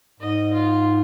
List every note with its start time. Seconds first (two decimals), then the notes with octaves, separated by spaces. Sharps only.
0.20 G#2 D#5
0.53 F4